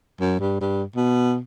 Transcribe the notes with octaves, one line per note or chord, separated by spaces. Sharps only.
F#2
G2
G2
B2